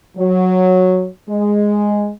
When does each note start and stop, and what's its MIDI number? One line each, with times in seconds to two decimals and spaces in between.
0.18 1.09 54
1.30 2.11 56